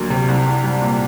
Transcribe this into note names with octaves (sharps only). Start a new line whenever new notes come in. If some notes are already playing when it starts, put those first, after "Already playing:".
Already playing: D2 F#3 A#3
C3
C2
C2
G3
A#2